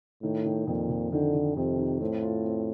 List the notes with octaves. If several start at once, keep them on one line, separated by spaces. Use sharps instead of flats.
A2 D#3
D#3
F2 A#2
F2
D3 D#3
D#3
F2 C3
D#3
A2 C4
F4
C4